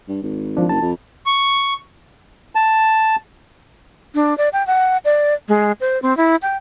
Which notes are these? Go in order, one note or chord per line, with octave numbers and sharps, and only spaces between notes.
G2
G#1
F3 D4
F#1 A5
F2
C#6
A5
D4
D5
G5
F#5
D5
G#3
C5
C4
E4
G5